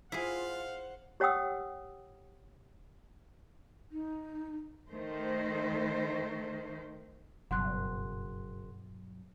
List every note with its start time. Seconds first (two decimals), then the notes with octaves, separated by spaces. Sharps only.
0.12 E4 F4 G#4 C5 F5 F#5
1.20 G4 C#5 F#5 G5 D#6 E6
3.91 D#4
4.88 D#3 A3 C5
7.51 F#1 G2 B2 F#3 F#5 C6 F#6